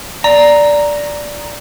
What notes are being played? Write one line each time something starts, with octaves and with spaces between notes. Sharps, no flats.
D5 A#5